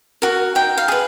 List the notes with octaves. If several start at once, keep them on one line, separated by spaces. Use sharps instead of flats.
F#4 A#4
D#4 G5
F5
G#4 B4